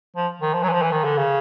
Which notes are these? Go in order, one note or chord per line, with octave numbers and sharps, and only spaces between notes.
F3
D#3
F3
F#3
E3
F3
E3
D#3
D3
C#3